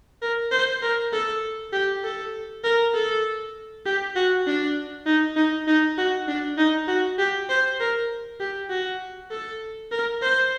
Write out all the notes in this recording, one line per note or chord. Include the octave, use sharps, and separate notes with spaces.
A#4
C5
A#4
A4
G4
A4
A#4
A4
G4
F#4
D4
D#4
D#4
D#4
F#4
D4
D#4
F#4
G4
C5
A#4
G4
F#4
A4
A#4
C5